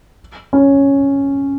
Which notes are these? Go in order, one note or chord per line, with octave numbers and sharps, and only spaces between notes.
C#4